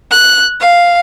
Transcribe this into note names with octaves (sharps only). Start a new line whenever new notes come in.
F#6
F5